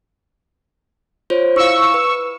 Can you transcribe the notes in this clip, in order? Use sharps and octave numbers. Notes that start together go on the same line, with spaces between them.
F4 C5 C#5
E4 F5 C#6 E6
B4